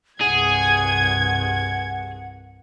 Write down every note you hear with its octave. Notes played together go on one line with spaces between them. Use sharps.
C2 G2 G#4 F#5 G#6